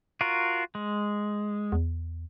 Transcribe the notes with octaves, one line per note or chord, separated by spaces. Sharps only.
F4 F#4 A#4
G#3
E2